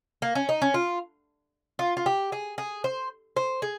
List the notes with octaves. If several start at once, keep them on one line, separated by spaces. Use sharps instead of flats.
A#3
C#4
D#4
C#4
F4
F4
F4
G4
G#4
G#4
C5
C5
G#4